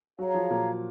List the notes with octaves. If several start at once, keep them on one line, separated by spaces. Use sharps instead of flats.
F#3 F#4 G#4 C#5 F5 A#5
F3 F4
A#2 A#3